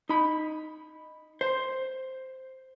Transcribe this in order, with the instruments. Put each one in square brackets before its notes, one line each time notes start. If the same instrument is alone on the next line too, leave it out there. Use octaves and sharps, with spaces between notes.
[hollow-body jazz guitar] D#4 B5
C5